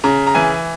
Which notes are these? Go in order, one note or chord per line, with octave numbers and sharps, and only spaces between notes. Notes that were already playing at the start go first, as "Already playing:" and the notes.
C#3 A#5
A#5
E3 G#5